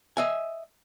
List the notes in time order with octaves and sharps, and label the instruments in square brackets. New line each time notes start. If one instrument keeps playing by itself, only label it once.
[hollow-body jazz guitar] D#5 E5 G#5